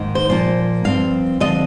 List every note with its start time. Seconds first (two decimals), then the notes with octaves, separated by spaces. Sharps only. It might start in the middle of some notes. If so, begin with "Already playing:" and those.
Already playing: G#2 D#3 A#3
0.15 C5
0.29 A#2 F3 A#3 F4 C5
0.84 G2 F3 C4 F5
1.40 D3 F3 C4 F4 D#5